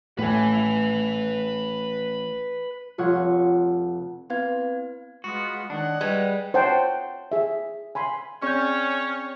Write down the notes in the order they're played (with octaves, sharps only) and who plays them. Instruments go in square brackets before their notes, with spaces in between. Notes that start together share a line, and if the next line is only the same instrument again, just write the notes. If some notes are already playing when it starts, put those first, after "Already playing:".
[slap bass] A1 [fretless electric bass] A2 [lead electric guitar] B4 G#5
[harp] F1 F4 C#5 F#5
[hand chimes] B3 C4 E4 B4 F5 G#6
[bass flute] G#3 [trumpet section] B3 F4 [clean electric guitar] F#4
[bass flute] D#3 [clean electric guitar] D4 [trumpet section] C#5 D#5 F#5
[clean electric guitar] G3 [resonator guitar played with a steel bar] G#3 [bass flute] B4
[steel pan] C5 C#5 F#5 G5 A5
G#4 E5
G#5 B5 C6
[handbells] C4 G#4 D5 [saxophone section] C#4 [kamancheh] C#5 [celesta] C#6 G6